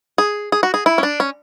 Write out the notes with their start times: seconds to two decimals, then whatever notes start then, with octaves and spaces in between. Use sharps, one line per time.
0.18 G#4
0.52 G#4
0.63 F#4
0.74 G#4
0.86 E4
0.98 C#4
1.03 D4
1.20 C#4